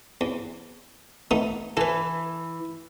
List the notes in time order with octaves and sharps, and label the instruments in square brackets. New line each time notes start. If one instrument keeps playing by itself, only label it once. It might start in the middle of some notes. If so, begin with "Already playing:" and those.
[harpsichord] E2
A3 B3 D#4
[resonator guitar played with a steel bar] E3 [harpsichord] A4 B4